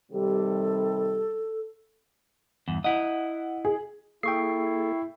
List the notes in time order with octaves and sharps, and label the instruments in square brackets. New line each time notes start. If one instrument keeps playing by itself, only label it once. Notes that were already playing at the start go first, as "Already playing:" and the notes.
[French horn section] C3 D#3 G3 [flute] A4
[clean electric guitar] E2 G2
[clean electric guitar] E4 D#5 [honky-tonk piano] F#5
[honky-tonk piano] G#4
[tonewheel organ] A#3 G#4 A4 [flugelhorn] E4 [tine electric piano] G5 C#6 C7